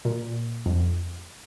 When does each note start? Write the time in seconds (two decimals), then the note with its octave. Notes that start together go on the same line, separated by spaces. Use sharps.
0.05 A#2
0.66 F2